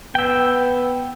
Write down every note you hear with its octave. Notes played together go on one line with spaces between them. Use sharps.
B3 G5 E6